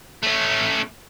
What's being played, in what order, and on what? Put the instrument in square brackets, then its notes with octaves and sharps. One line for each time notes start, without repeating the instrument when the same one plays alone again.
[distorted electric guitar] A3 C#4